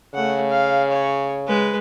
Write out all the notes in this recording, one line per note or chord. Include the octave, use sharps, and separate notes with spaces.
C#3 A3 F#5
F5
C#5
G#3 B4